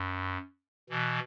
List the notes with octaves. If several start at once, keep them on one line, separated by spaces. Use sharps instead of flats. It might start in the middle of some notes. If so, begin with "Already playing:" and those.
Already playing: F#2
B2 E3